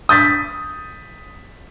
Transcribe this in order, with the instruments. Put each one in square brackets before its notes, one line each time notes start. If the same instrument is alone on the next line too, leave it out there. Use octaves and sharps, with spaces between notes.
[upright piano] D#6 G6 A6 B6